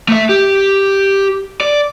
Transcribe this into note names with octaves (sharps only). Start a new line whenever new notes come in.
A3 E5
G4
D5